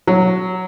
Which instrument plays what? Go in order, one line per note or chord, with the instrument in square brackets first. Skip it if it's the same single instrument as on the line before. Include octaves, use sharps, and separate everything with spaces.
[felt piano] F#3